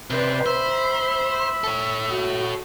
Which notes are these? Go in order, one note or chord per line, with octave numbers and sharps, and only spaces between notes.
C3 B4 C5 D5
C5 E5 B5
E5
A4 C#5
F#4